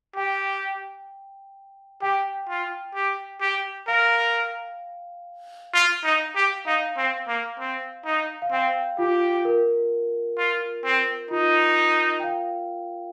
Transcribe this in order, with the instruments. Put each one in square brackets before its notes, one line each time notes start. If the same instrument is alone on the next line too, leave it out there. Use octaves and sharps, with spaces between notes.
[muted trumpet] G4 [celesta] G5
[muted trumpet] G4 [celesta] G5
[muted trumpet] F4
G4
G4
[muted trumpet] A#4 [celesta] F5
[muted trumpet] F4
D#4
G4
[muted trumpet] D#4 [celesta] F5
[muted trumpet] C4
A#3
C4
D#4
[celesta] F5
[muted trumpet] C4 [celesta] G5
[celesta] F4 [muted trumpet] G4
[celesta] A#4
[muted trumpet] F4
C4
[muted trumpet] D#4 [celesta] F4
[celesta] G5
F5